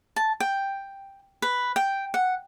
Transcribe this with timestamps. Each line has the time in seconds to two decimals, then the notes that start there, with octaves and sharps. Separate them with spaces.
0.16 A5
0.40 G5
1.42 B4
1.76 G5
2.14 F#5